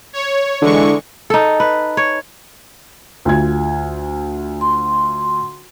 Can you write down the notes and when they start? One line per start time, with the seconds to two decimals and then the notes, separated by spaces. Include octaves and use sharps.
0.13 C#5
0.62 D3 E3 G#3 C#6
1.30 D#4 A4
1.60 B4
1.97 C#5
3.25 D2 F4 G#6
4.61 C6